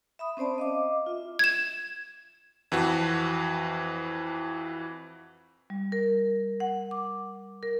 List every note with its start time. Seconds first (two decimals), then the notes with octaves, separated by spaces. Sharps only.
0.19 E5 B5 D#6
0.37 C4 C#4 C5 D5 A5
0.58 D#5 F5 D6
1.06 F4 E5
1.39 G#6 E7
2.72 F2 E3 F#4 A5
5.70 G3
5.92 A#4
6.60 F#5
6.91 D6
7.63 A#4